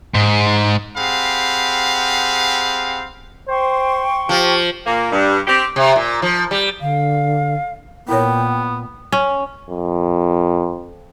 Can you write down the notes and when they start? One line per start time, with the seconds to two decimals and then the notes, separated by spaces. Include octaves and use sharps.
0.15 G#2
0.97 C4 G4 G#4 F5 F#5 B5
3.48 C5 G5 C6 C#6
4.29 F3 G4
4.86 A#2 A#3
5.12 G2
5.47 C4 G4
5.76 C3
5.96 A#2
6.22 F3
6.51 G3
6.81 D3 F5
8.09 A#2 B3 E4 A#4 C#5 G5
9.12 C#4
9.70 F2